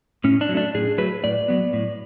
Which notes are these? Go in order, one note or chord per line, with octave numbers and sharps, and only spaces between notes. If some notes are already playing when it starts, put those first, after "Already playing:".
A2 C#4
D4
F#3
A3 D4
A2 G#4
F#3 A3 B4
A2 D5
F#3 B3
A2